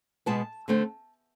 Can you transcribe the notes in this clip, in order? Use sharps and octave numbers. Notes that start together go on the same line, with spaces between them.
B2 G#3 B3 A5
D3 A3 C4